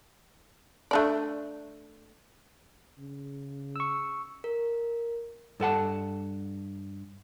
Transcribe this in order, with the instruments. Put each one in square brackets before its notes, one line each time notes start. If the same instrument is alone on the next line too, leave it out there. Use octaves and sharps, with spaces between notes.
[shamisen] A3 D4 D5
[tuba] C#3
[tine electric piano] C#6 E6
[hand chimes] A#4
[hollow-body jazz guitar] G2 A4 F#5 A5